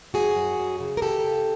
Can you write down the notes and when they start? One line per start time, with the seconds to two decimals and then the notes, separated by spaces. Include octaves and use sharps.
0.14 F#2 F#4 G#4
0.36 F#2
0.58 F#2
0.80 C#3
0.97 A#4
1.02 C#3 G4 A4
1.24 C#3